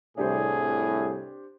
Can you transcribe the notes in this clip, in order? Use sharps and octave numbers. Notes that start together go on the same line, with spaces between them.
C2 A2 D4 G4 G#4 C5